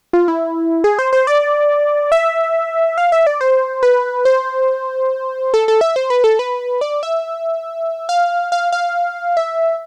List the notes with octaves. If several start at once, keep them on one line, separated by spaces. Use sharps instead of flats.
F4
E4
G#4
C5
C5
D5
E5
F5
E5
D5
C5
B4
C5
A4
A4
E5
C5
B4
A4
B4
D5
E5
F5
F5
F5
E5